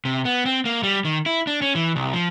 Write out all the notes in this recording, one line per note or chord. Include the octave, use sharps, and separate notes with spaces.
C3
B3
C4
A#3
G3
D#3
E4
D4
C#4
E3
C2
F3